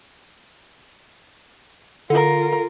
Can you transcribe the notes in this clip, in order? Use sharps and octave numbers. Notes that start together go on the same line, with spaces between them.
D3 F4 A#4